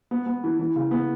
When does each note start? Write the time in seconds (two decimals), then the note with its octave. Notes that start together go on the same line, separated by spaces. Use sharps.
0.11 B3
0.26 B3
0.44 E3
0.59 E3
0.76 C#3
0.91 B3